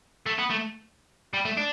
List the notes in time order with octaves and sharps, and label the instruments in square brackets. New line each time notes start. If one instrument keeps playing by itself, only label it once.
[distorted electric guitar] A3
B3
A3
G3
A3
D4